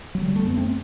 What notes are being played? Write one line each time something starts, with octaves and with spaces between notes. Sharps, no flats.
D3 F#3
G3
A3
F#2 B3
A3 C4